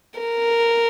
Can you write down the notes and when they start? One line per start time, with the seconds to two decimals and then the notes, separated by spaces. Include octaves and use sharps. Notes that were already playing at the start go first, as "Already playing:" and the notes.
0.20 A#4